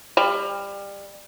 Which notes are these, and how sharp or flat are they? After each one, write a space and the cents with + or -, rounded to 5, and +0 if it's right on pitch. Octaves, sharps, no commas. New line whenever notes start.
G3 +25